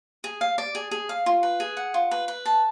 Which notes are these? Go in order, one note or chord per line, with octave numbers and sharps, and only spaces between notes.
G#4
F5
D5
G#4
G#4
F5
F4
B4
G#4
F#5
F4
B4
B4
A5